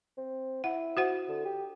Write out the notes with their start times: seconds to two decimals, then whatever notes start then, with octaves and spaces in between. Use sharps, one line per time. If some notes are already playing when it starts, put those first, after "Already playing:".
0.17 C4
0.64 E4 F#5
0.97 F#4 C5 F#5
1.29 D3
1.45 G4